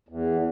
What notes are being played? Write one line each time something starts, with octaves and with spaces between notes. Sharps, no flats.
E2